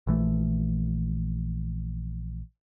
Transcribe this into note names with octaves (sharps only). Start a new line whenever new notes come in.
A#1 E3 A3